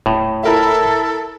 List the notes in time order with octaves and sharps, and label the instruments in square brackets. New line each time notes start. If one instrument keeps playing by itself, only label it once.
[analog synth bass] D#1 [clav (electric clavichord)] A2
[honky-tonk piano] E4 A#4 E5 [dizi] A4